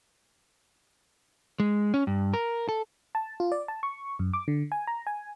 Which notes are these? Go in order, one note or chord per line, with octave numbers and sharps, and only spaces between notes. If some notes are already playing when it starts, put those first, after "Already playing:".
G#3
C#4
G2
A#4
A4
A5
F4
D5
A5
C#6
F#2
D6
D3
G#5
A#5
G#5